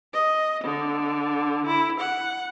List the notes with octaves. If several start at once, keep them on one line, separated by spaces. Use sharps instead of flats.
D#5
D3
E4
F#5